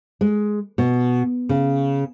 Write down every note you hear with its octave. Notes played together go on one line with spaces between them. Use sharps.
G#3
B2
C#3